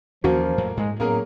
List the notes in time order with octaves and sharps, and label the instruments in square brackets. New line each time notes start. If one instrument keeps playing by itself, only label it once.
[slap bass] D#2 E3 C#4 [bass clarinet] F3 [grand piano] A#3 [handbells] F#4
[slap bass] F2 A2 F#3
[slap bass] G#2 [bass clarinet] G#3
[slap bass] A2 B3 C#4 [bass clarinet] F#3 [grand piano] A#3 G#4 A#4